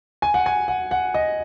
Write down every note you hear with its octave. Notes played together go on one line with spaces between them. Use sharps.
G#5
F#5
G#5
F#5
F#5
D#5